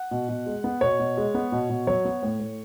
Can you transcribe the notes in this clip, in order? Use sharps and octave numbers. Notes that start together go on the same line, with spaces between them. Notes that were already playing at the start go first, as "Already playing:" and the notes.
Already playing: F#5
B2
B2
G#3
B3
B2 C#5
B2
G#3
B3
B2
B2
F#3 C#5
B3
A2
A2